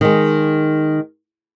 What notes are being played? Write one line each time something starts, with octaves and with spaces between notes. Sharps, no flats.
D#3 G#3